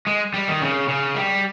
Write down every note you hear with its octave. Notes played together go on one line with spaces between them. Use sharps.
G#3
G3
D#3
C#3
C#3
G3